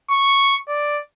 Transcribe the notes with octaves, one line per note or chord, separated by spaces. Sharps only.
C#6
D5